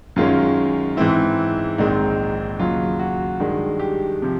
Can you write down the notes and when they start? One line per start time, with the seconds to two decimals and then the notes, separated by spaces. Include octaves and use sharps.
0.16 F#2 D#3 G#3 C#4 F4
0.97 G#2 E3 G#3 C4 E4
1.78 A#1 G#2 D#3 G#3 C4 D#4
2.59 D#2 C#3 F#3 F4
2.99 F#4
3.40 G2 D#3 G#3
3.79 G4
4.22 C3 F3